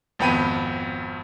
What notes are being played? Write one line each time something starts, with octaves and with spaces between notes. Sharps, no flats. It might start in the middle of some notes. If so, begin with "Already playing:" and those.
G#1 F2 B3 G5 B5 D#7